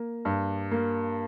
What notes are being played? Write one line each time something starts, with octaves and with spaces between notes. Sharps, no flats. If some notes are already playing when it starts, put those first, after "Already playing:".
Already playing: A#3
G2
A#3